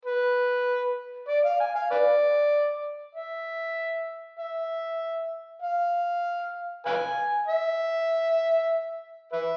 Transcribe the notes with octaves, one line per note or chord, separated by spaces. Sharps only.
B4
D5
F5
G#5
F5
B4 D5
E5
E5
F5
B4 F5 G#5
E5
B4 E5